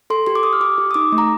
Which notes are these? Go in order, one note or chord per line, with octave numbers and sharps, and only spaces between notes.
A4 C6
G4 C6
D6
G4 D#6
F6
G4 D6
G4
D#6
D#4 D6
A3
A#5